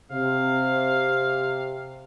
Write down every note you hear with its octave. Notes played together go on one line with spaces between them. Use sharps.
C3 F5